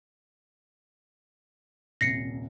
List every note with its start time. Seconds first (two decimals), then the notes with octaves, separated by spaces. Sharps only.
2.01 D#1 C2 A#6 C7 C#7